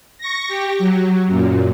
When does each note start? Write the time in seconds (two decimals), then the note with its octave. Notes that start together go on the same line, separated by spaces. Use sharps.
0.18 C#6 A#6
0.48 G4
0.78 F#3
1.27 F#2 A#2